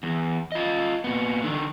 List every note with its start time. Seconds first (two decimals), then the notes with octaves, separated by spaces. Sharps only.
0.03 E2
0.52 F4 D#5
1.04 A#2 B3
1.43 D3 D#3